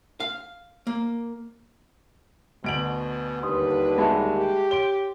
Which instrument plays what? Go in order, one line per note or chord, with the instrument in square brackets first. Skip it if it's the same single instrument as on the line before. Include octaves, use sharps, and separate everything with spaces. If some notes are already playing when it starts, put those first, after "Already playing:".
[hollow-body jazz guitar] F5
A#3
[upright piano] D2 D7 F#7 [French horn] B2
[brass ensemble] D#2 D3 G3 [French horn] B4 [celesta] C6 D#6
[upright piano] G#3 F#4 [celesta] E5 A5 B5
[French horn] G4
[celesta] C#5 C6 D7 [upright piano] G7